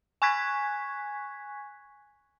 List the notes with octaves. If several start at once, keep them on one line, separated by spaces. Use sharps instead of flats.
G#5 C#6 F#6 G#6 B6